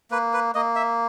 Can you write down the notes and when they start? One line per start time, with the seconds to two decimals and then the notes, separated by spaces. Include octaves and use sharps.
0.11 A#3 B4
0.33 B4
0.55 A#3 D#5
0.76 E5